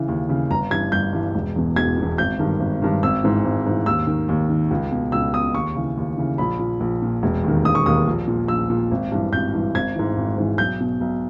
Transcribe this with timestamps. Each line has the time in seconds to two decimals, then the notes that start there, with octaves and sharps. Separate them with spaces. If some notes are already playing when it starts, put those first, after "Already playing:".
Already playing: C#3 E3
0.08 D#2
0.29 C#3 E3
0.51 G1 A#5
0.71 G2 E3 G#6
0.92 G1 G6
1.13 G2 E3
1.35 E1
1.56 E2 B2
1.76 E1 G#6
1.98 E2 B2
2.18 G#1 G6
2.39 G2 D#3
2.60 G#1
2.82 G2 D#3
3.03 G#1 E6
3.23 G#2 E3
3.45 G#1
3.66 G#2 E3
3.86 D#2 E6
4.07 D#3
4.29 D#2
4.49 D#3
4.71 C#2
4.91 B2
5.12 C#2 E6
5.34 B2 D#6
5.54 D#2 C#6
5.75 C#3 E3
5.97 D#2
6.18 C#3 E3
6.38 A#1 B5
6.59 A#2
6.80 A#1
7.02 A#2
7.23 E1
7.43 D#2 D#3
7.65 E1 D#6
7.75 C#6
7.86 D#2 D#3 D#6
8.07 A#1
8.28 A#2
8.48 A#1 E6
8.70 A#2
8.91 G#1
9.12 G2 E3
9.33 G#1 G6
9.53 G2 E3
9.75 G#1 G#6
9.95 G#2 E3
10.17 G#1
10.38 G#2 E3
10.58 B1 G6
10.80 B2
11.01 B1